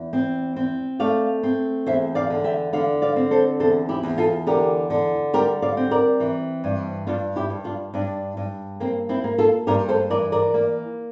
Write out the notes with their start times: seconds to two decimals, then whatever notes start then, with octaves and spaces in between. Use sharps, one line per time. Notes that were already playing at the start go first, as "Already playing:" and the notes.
Already playing: E2
0.13 C4
0.56 C4
0.99 A3 D5 F5
1.43 C4
1.86 E2 C5 E5
2.15 D5 F5
2.30 D3
2.44 E5 G5
2.73 D3 D5 F5
3.02 D5 F5
3.16 C4
3.31 A4 C5
3.60 E2 A4 C5
3.89 E4 G4
4.03 E2
4.18 F4 A4
4.47 D3 G4 A#4
4.90 D3
5.33 G3 G4 A#4
5.62 D5 F5
5.77 C4
5.91 A#4 D5
6.20 E3
6.64 G2
7.07 G2 D4 F4
7.36 E4 G4
7.50 G2
7.64 D4 F4
7.94 G2 D4
8.37 G2
8.80 A#3 C4
9.09 C4 E4
9.24 A#3
9.38 F4 A4
9.67 G2 G4 A#4
9.89 A4 C5
10.10 E3 A#4 D5
10.32 A#4 D5
10.54 A#3